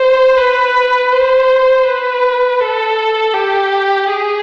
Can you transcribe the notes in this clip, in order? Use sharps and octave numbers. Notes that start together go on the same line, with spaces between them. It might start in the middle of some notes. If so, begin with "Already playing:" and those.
Already playing: C5
B4
C5
B4
A4
G4
G#4